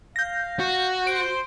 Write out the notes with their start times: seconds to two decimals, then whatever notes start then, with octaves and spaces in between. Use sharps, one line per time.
0.16 F5 G6 A#6
0.59 F#4
1.07 C5 D7